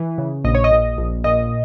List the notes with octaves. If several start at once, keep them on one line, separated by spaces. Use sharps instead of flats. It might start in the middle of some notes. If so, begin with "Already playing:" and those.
Already playing: E3
C#3
A#1 D#5
C#5
D#5
A#2
A#1
A#2 D#5